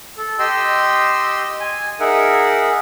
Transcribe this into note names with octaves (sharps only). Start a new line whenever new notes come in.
A4
G4 D#5 G5 C6 E6
G#5
D#4 G#4 A#4 E5 F#5